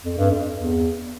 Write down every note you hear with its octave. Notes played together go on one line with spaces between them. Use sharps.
F2
G2
F2
E2